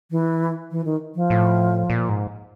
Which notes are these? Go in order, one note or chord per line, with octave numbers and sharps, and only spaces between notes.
E3
E3
D#3
F3
A2
A#2
G#2